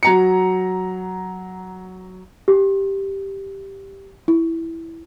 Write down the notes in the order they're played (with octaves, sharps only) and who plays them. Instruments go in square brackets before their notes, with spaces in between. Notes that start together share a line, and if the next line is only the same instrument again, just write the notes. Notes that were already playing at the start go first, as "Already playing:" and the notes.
[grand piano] F#3 A#5 C#7
[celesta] G4
[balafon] E4